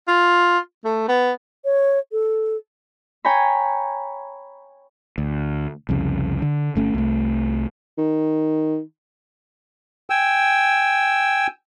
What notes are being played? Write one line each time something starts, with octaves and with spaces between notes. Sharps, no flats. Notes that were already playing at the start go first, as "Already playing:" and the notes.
F4
A3
B3
C#5
A4
C#5 G5 G#5 A#5 B5
D2
C2 F2 C#3
D3
G1 A3 C#4
C2 A3
D#3
G5 G#5 E6